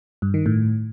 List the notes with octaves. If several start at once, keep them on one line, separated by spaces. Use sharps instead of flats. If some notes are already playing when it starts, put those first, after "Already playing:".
G2
D#3
A2